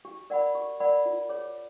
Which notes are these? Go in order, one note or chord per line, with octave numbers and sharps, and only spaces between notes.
G4
A#4 D5 F#5 B5
G4
A#4 D5 F#5 B5
F4
G#4 C#5